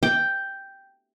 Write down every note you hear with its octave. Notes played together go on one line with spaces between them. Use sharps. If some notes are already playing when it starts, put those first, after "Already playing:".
G5